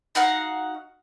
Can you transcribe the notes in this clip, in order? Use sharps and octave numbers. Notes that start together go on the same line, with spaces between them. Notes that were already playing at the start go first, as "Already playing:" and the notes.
D#4 F#4 F5 F#5